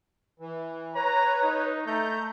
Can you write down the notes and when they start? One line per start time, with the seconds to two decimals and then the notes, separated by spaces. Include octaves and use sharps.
0.40 E3
0.95 B4 C#5 A#5
1.43 D#4
1.86 A3 A#5 G6